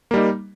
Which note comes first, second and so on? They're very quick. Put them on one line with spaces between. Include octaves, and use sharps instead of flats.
A#3 G3 D#4